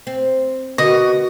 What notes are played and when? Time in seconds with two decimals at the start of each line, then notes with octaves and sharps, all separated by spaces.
0.07 C4
0.78 D3 B3 F#4 A#4 D#5